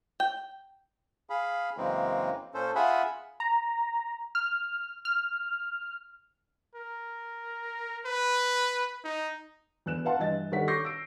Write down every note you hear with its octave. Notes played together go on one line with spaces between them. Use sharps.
G5
G#4 F5 B5
F#2 C#3 E3 G#3 A#3 C4
A#2 C#4 A4 C5
F4 G#4 E5 F#5 G#5 B5
A#5
F6
F6
A#4
B4
D#4
E2 F#6 E7
B4 F5 F#5 A5 C6
G2 E3 D#5 A6
D#3 G3 A4 C#5 F#5 B6
C#6 D6 G6 A#6 C7
E6 D7